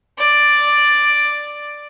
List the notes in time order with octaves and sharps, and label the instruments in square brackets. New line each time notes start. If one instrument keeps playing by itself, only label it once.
[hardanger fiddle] D5